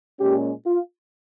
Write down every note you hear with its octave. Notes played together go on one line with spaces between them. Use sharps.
A#2 G#3 C#4 G4
F4